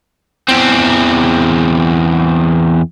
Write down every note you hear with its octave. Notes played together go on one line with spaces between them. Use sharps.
E2 C4